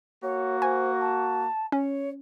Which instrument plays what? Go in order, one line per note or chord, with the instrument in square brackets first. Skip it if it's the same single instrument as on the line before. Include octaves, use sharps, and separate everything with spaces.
[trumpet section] A#3 F#4 [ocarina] C#5
[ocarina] C5 [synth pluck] G#5
[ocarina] A5
[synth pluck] C#4 [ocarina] C#5